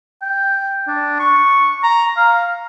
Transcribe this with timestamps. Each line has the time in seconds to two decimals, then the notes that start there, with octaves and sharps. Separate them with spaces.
0.22 G5
0.87 D4
1.20 C#6
1.83 A#5
2.17 F5